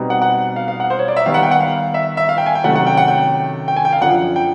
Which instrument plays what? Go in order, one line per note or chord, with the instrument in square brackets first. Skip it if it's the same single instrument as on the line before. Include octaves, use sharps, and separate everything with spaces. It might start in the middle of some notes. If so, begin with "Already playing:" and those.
Already playing: [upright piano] B2 G3 C4 D#4
F#5
F#5
F5
F5
F#5
C5
C#5
D5
E5
D#3 G3 B3 F5
F#5
G5
F#5
F5
E5
E5
F5
G5
G#5
G5
C3 D#3 F#3 A3 C#4 F#5
F#5
G5
F#5
G5
G5
G#5
G5
F5
F#2 D3 F3 F#5
G5